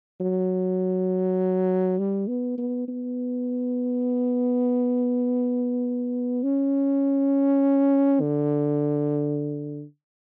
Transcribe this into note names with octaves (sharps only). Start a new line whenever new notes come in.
F#3
G3
B3
B3
B3
C#4
D3